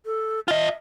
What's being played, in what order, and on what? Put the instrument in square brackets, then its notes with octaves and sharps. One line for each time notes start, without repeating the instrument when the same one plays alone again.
[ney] A4
[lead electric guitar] F4 D#5 [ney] E5